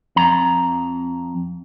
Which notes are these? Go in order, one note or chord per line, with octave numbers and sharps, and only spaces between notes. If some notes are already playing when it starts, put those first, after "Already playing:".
F2 A#5